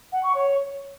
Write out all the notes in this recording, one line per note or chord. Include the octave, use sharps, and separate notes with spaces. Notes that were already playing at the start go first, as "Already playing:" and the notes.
F#5
C#6
C#5